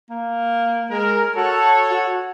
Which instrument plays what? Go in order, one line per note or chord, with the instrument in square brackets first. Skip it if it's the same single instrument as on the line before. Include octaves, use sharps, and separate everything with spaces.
[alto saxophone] A#3
[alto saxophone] G#3 [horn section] A#4
[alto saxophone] F#4 [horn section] A4 C#5
[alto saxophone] F#4